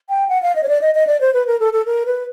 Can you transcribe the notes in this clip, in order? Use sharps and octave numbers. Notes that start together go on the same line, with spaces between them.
G5
F#5
F5
D#5
C#5
D5
D#5
D#5
D5
C5
B4
A#4
A4
A4
A#4
B4